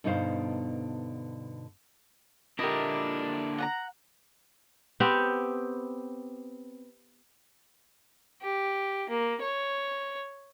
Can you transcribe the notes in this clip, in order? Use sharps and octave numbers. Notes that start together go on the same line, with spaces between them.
G2 B2 D3 D#4 C5 F5
A#2 D3 D4 E4 G4 A#4 D#5
F#5 G#5 A#5
B3 C4 G4
G4
A#3
C#5